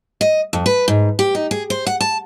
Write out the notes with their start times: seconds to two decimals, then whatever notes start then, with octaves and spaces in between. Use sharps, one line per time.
0.21 D#5
0.53 F2
0.66 B4
0.88 G#2
1.19 G4
1.35 D#4
1.51 G#4
1.70 C5
1.87 F#5
2.01 A5